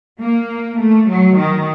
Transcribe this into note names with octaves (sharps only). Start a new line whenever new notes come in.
A#3
A3
F#3
D#3